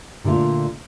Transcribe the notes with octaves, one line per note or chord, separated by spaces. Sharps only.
A#2 D3 A3 D4 F4